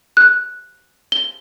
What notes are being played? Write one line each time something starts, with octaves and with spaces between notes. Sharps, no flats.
F#6
G7